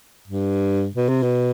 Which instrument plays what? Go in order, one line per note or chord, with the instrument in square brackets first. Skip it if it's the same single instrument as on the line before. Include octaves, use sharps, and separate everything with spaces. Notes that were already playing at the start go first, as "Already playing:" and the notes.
[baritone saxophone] G2
B2
C3
B2